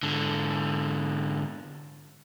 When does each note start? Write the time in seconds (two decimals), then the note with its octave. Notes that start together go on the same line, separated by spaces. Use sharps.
0.03 G#2 D3